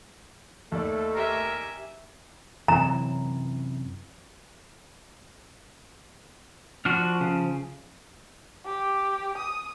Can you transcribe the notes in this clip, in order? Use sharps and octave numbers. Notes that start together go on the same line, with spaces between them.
D#2 A3 A4 D5
G4 A#4 E5 G#5
F#2 C3 E3 A#5
F3 D4 F#4 F6
C#3
G4
D#6